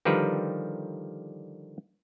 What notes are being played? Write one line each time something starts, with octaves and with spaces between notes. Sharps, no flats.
D3 D#3 F3 G3 A#4 B4